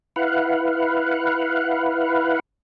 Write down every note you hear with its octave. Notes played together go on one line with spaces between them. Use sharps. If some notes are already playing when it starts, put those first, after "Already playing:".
E4 B4 F5 F#5